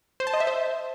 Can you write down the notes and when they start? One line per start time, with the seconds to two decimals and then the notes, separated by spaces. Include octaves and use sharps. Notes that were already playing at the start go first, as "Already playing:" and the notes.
0.20 C5
0.27 A5
0.34 D#5
0.40 E5
0.47 C5